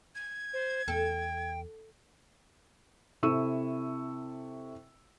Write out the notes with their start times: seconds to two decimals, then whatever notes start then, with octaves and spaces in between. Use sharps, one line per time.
0.15 G#6
0.54 C5
0.88 E2 A4 G5
3.23 C3 E4 A4 C#6 E6 D#7